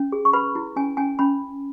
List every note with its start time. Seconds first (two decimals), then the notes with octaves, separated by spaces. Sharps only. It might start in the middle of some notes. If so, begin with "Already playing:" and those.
Already playing: C#4
0.12 G#4
0.25 C#6
0.33 B4 B5
0.55 E4
0.76 C#4 G#5
0.97 C#4 G#5
1.19 C#4 B5